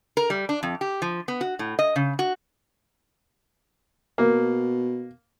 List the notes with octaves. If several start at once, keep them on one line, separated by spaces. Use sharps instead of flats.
A#4
G3
D4
F2
G4
F3
B3
F#4
A2
D#5
C#3
F#4
B2 A#3